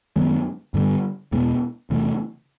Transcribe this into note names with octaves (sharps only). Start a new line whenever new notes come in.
F#2 D#3 G#3 B3
G2 D3 G3 B3
E2 B2 G#3 B3
E2 C3 E3 A3